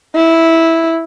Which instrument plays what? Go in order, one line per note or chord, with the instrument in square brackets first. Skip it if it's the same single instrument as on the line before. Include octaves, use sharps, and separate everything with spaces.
[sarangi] E4